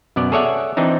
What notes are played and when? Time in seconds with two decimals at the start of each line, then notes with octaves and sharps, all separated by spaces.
0.16 F#2 B2 B3 D5
0.32 G#4 A4 C#5 D5 E5 F#5
0.77 E3 C4 D4 D#4